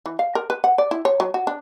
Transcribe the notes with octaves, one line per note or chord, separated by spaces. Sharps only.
E3
F5
A#4
B4
F#5
D5
E4
C#5
F#3
F#4
D4